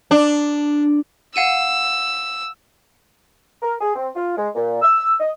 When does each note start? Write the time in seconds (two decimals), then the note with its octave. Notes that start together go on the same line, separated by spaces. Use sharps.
0.11 D4
1.36 F5 F#5 E6 D#7
3.63 A#4
3.80 G#4
3.95 C4
4.15 F4
4.37 G#3
4.55 A#2
4.82 E6
5.20 D#5